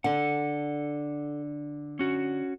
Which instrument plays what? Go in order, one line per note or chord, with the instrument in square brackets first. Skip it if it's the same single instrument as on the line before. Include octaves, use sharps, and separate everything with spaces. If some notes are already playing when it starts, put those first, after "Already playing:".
[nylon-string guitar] D3 [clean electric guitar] A4 F#5
[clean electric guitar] C#4 F#4